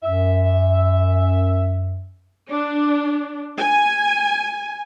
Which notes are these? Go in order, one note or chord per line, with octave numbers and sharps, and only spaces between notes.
F#2 E5
D4
G#5